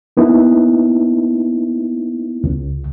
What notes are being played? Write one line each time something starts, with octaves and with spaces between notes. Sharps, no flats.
A#3 B3 D#4 E4
C#2